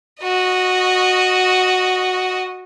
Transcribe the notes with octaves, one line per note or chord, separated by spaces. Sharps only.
F#4 D#5